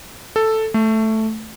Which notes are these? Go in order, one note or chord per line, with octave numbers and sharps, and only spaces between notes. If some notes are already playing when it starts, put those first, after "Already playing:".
A4
A3